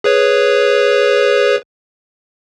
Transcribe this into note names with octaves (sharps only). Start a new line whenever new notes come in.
G#4 B4 C#5